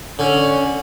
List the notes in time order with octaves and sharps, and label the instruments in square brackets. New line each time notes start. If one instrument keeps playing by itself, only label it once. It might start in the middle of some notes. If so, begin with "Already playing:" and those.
[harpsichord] D3 [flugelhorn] C#4